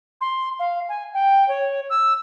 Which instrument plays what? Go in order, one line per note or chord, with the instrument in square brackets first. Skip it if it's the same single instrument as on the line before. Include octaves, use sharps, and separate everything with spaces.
[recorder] C6
F5
G#5
G5
C#5
E6